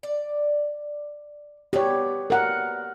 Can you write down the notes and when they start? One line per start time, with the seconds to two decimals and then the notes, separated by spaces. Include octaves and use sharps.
0.03 D5
1.73 B2 B3 G4 C#5 D5
2.30 A#4 F#5